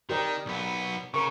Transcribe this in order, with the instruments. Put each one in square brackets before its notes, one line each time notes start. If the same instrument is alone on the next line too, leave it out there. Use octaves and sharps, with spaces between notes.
[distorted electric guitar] D#3 [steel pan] G4 A#4 D5
[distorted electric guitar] B1 B3
[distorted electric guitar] C#3 [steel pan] A#4 C#6